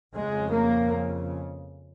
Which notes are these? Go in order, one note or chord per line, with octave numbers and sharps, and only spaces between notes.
F2 C#3 G#3
A#3